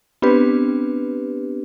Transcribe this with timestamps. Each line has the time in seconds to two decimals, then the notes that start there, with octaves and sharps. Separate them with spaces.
0.22 B3 C4 D4 G4 B4